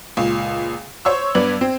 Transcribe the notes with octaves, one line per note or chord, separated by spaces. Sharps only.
C#2 A#2
C5 C#5 C#6 E6
G2 B3 B4 D5 G#6 F#7
C4